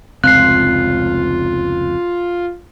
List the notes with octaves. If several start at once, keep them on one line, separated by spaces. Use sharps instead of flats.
F1 C#2 C4 F4 F#6 C7